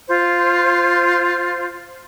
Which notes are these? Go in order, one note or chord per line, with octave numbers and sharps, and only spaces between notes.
F4 C5